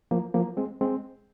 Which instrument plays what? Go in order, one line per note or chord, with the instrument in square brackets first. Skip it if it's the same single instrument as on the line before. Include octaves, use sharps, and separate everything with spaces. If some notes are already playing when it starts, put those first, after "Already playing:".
[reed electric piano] F3 A#3
F3 A#3
G#3 C4
G#3 C4